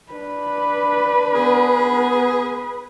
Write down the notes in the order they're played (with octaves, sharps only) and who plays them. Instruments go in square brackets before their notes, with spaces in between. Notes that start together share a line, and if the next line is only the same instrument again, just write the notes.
[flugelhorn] D4 [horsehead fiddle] B4
[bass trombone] B3 [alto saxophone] G#4